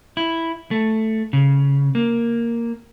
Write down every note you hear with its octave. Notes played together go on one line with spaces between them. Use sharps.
E4
A3
C#3
A#3